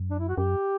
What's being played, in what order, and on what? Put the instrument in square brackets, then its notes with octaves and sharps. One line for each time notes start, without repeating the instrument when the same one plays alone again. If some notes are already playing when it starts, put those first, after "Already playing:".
Already playing: [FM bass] F#2
[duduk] D4
E4
F#4
[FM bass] F#2 [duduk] G4